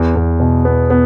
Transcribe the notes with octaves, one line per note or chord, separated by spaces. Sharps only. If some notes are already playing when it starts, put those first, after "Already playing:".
Already playing: E2
E2
B2
B3
B3